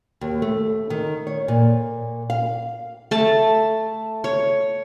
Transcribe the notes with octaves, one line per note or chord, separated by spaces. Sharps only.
D#2
A3
D#3
C#5
A#2
F5
A3 A5
C#5